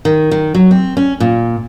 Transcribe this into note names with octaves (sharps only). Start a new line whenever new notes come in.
D#3
D#3
F#3
C4
C#4
A#2